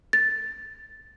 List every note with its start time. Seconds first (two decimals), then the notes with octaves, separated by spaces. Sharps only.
0.13 A6